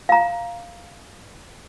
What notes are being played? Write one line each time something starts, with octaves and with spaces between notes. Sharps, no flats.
F5 A#5